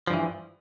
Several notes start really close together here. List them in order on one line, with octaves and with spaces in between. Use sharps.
F3 G2 E3